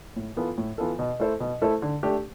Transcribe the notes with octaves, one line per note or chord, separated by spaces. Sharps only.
A2
E3 B3 F4 A4
A2
E3 B3 F4 A4
B2
A3 E4 A4 C5
B2
A3 E4 A4 C5
D3
A3 D4 G4